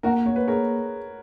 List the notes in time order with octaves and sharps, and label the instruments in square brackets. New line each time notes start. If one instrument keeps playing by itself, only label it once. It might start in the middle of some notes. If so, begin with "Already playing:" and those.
[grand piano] A#3 [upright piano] F#4 A#4
[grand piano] A#3 [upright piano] C#5
[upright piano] B4
[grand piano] G#4 [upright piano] A#4 C#5